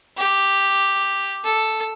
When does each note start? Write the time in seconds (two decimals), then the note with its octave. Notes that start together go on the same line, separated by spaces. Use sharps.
0.17 G4
1.44 A4